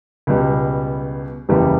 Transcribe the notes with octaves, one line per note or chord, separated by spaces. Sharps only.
C#2 B2 G3
F#1 E2 C#3 E3 G3